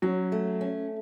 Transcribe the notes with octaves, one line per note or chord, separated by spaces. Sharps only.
F#3 C#4
A3
C#4